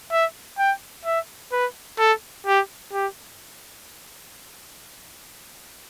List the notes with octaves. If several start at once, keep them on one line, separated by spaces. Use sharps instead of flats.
E5
G5
E5
B4
A4
G4
G4